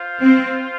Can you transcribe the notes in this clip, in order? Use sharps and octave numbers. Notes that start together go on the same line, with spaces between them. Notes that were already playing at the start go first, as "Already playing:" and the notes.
Already playing: F4 C5 F5
C4